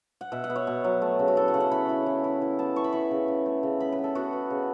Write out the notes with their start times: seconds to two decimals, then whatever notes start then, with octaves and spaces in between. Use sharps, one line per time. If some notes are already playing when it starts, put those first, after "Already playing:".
0.21 F#5
0.32 B2 E5
0.44 F#5
0.50 B3
0.56 C#5
0.67 B2
0.84 F#3
1.02 A3
1.19 C#3
1.28 F#4
1.37 E4 A4
1.48 F#5
1.54 C#3
1.60 F#5
1.71 E4 B5
1.89 E4
2.06 E3
2.24 E4
2.42 E3
2.59 B3 A5
2.76 E3 C#6
2.84 B5
2.93 E3 C#6
3.11 C#3
3.28 C#3
3.46 A3
3.63 C#3
3.80 B3 B5
3.92 B4
3.99 B3
4.04 A4
4.15 B3 F#4
4.33 B3
4.50 C#3